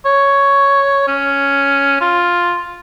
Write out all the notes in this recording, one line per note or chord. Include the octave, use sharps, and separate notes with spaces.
C#5
C#4
F4